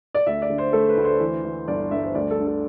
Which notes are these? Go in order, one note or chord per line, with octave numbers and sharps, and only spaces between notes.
D5
D2 E5
D5
D3
C5
A3 A4
B4
D2
C5
E3
E3
G1 D5
G2 E5
C5
D2 D5
A4
D3
A4